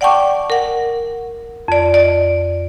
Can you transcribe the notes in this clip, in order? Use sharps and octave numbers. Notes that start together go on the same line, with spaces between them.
D5 F#5 G5 A5 C#6 D6
A#4 F#5
F2 D5
D5 D#5